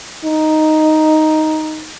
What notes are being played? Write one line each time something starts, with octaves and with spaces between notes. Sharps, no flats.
D#4